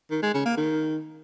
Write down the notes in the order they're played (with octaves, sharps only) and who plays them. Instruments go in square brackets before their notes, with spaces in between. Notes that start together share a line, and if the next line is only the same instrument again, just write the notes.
[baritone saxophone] D#3
G#3
C#3
A#3
D#3